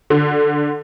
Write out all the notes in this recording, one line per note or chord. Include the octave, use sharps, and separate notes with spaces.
D3